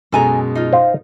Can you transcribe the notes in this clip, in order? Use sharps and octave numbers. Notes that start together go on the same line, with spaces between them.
F#2 B2 G#3 A4 G#5 A#5
D#4 F4
C5 F5